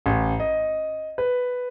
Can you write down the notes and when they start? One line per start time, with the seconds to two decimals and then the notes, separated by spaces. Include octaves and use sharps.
0.06 A1
0.40 D#5
1.18 B4